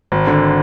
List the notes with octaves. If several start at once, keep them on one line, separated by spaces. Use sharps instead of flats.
G#1
D3